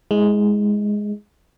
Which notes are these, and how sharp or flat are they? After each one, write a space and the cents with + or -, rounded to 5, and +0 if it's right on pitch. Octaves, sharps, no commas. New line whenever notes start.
G#3 +0 E4 -30